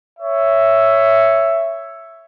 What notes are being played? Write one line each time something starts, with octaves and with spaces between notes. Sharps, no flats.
C#5 E5